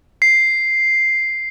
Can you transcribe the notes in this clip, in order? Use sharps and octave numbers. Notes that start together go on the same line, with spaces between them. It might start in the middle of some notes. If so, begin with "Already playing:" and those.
C7